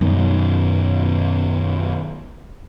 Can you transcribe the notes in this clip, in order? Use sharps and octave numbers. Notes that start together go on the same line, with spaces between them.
F#2 B2 D#3